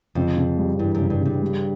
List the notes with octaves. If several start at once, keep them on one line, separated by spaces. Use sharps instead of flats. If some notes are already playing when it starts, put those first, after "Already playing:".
F2 C#3
C#3
G3
G2 E3
F#2
C#3
G2
G2 C#3
G3